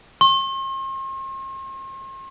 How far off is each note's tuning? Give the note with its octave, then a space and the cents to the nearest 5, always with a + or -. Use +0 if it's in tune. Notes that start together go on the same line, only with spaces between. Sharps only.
C6 +45